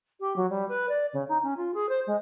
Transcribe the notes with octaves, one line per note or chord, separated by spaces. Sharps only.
G4
F#3
G3
B4
D5
C#3
D#4
C#4
F4
G#4
C5
G#3